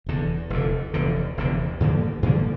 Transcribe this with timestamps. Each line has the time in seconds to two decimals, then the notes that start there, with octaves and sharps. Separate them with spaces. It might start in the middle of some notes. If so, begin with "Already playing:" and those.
0.06 F1 E2 D3
0.50 F1 E2 D3
0.94 F1 E2 D3
1.37 F1 E2 D3
1.80 G2 D3 F3 A#3
2.23 G2 D3 F3 A#3